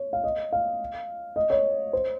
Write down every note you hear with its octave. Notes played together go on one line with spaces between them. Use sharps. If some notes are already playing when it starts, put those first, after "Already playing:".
Already playing: C#5
F5
D#5
F5
D#5
C#5
C5